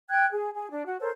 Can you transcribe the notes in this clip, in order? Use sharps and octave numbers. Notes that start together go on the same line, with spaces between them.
G5 F#6 G#6
G#4
G#4
D4
F#4
A4 A#4 C5 C#5